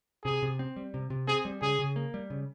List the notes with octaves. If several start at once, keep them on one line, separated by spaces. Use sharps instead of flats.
C3 G#4
C3
C4
G3
C3
C3
C4 G#4
G3
C#3 G#4
C#3
A#3
G3
C#3